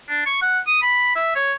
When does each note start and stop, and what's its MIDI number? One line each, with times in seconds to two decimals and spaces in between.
0.09 0.21 62
0.26 0.39 85
0.42 0.59 78
0.67 0.80 87
0.82 1.13 83
1.15 1.35 76
1.35 1.53 73